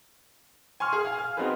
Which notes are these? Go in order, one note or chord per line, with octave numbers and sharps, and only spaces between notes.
G#5 C6 C#6 F6
G#4
F5 G#5
F6
B3 C4 D#4 F#4 G#4 B4